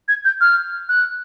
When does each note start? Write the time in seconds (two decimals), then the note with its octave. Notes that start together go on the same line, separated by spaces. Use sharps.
0.08 G#6
0.25 G6
0.41 F6
0.89 F#6